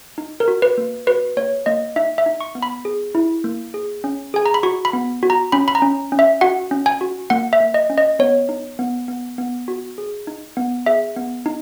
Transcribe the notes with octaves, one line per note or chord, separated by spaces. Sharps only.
D#4
A#4
F#4
B4
A#3
F#4 B4
A#3 C#5
A#3 D#5
D#4 E5
E5
D#4
C#6
B3
B5
G#4
E4
A#3
G#4
C#4
G#4 G#5
A#5
B5
F#4 C#6
B5
B3
F#4
A#5
C#4 B5
B5
A#5
C#4
C#4
E5
F#4 F#5
C#4
G#5
F#4
A#3 F#5
E5
A#3
D#5
C#4
D#5
B3 C#5
D#4
B3
B3
B3
F#4
G#4
D#4
B3
G#4 E5
B3
D#4